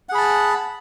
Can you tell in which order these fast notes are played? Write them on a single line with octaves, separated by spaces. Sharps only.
F#5 G#4 B5 A5